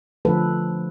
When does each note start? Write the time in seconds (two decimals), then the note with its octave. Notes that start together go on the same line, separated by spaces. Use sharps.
0.25 D3 F3 A3 A4 B4